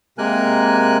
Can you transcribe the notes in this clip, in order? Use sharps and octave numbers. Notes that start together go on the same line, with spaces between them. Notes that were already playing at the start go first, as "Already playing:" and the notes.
C3 G#3 A#3 A#4 G#5 F#6